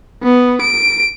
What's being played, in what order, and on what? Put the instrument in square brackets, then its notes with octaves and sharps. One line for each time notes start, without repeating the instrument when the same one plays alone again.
[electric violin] B3
D7